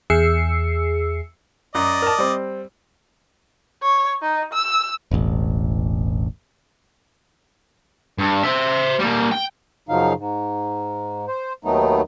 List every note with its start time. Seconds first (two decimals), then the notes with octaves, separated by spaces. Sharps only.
0.10 E2 G#4 E6 C7 C#7
1.75 F#2 D5 D#5
2.02 A#4 A5
2.18 G3 C4
3.82 C#5
4.22 D#4
4.53 E6
5.11 E1 A1
8.19 G2
8.43 C5 E5
9.00 G3 A#3
9.32 G5
9.89 F#2 C#3 F3 F#3 D#4 F5
10.18 G#2
11.28 C5
11.64 D#2 D#3 F#3 A3 B3 D#4